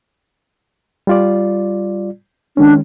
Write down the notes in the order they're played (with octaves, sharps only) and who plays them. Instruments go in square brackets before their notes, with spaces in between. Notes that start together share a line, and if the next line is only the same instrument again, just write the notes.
[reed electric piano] G3 F4 D5
[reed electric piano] D#3 G#3 C#4 [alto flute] D4